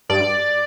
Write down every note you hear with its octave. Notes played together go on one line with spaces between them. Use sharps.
G2 D5